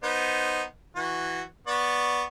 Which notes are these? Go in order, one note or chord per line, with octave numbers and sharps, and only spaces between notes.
B3 D#4 C5
E3 F#4
B3 D5 C#6